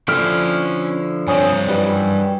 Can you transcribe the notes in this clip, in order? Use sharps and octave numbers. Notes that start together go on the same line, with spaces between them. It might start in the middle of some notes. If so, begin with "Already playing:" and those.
D3 F3 C#4 E4 G5 F6
G2 C4 C#4 C#5 D#6
F#2 E3 G3 G5